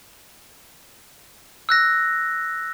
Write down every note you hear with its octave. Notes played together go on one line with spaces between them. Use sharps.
E6 F#6 A#6